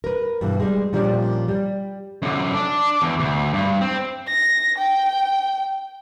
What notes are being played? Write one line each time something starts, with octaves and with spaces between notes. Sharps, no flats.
A#4 B4
G2 B2 E3
G3 G#3
A#2 F3 G3 C#4 D4 G4
G3
F#2 D3
D4
E2 E3
D2
G2
C4
A#6
G5